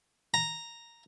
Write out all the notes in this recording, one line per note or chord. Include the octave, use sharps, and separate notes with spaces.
A#5